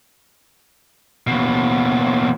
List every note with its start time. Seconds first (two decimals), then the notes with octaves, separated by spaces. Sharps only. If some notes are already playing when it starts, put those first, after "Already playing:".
1.27 D#2 B2